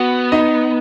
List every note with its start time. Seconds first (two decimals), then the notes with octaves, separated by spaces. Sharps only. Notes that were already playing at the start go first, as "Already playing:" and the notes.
Already playing: B3 F#4 F#5
0.32 D#4 D#5